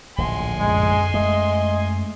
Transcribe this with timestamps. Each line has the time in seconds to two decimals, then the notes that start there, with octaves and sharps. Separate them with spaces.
0.18 D1 A#1 G#5 C6
0.60 F#2 G#3
1.14 G#3 A3 D#5